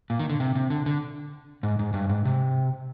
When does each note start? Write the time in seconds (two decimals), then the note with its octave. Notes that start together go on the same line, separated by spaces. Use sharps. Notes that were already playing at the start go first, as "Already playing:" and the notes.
0.10 A#2
0.19 D#3
0.30 D3
0.40 C3
0.55 C3
0.70 D3
0.86 D3
1.63 G#2
1.79 G#2
1.94 G2
2.10 G#2
2.25 C3